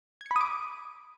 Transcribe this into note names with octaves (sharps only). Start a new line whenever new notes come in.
B5 D6 D#6 G#6 C#7